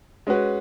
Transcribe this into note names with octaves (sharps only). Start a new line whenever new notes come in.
G#3 C#4 F#4 B4